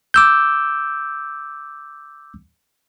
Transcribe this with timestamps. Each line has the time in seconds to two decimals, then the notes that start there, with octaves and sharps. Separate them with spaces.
0.14 D6 E6 G6